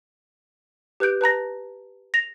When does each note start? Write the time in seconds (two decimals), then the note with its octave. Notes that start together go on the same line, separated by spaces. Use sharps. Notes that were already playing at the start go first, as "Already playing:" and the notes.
1.00 G4 B4 F#6 G6 D7
1.21 B4 A5 A#5 A#6
2.14 A#6 F7